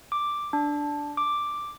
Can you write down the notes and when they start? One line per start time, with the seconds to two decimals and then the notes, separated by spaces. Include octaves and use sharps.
0.12 D6
0.53 D4
1.17 D6